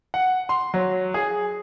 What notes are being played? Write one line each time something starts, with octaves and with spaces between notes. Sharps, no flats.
F#5
C6
F#3
G#4